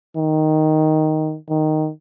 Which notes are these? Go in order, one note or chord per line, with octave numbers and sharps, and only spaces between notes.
D#3
D#3